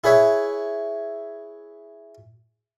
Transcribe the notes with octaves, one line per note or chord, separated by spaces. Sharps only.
E4 G#4 B4 C#5 E5